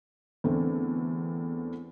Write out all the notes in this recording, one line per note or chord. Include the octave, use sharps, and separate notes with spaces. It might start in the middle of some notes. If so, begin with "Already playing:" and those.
E2 D3 A3 C4